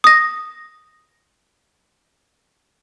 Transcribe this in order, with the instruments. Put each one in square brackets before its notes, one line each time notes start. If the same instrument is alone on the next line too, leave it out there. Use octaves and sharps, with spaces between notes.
[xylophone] D#6 A#6